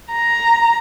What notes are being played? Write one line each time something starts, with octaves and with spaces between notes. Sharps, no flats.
A#5